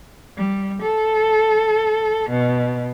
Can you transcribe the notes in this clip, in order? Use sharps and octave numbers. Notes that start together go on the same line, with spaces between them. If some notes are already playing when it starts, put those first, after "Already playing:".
G3
A4
B2